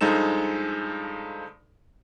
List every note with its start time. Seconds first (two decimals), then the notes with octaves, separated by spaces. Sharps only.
0.01 G2 F3 G#3 D#4 A4 E7